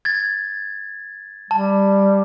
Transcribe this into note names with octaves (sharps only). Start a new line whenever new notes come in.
G#6 A6
G3 A5